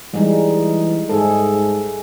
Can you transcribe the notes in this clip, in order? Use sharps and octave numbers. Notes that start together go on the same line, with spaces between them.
E3 G3 G#3 D#4
G#2 G#4 A4